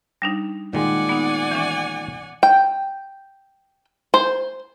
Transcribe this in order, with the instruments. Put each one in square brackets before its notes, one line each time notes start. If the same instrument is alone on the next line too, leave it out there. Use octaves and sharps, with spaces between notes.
[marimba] G3 D4 D#4
[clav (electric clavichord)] A#2 D#3 G#3 [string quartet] D5 F#5 G#5
[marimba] B3 D#4
E3 C#4
[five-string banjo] G5
C5